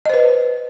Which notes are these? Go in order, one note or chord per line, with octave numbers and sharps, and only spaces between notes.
B4 C5 D#5